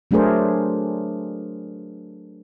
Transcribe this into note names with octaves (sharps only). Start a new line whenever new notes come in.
F#3 A3 D4 G#4 A#4 C5